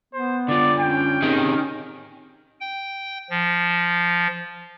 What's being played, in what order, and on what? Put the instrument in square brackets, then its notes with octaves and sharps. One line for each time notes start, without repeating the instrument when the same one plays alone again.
[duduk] B3 [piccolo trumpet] C5
[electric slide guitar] D3 F4 [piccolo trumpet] D5
[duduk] C#4 [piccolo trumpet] G5
[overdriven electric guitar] D#3 [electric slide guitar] C4 G4 G#4
[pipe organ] G5
F3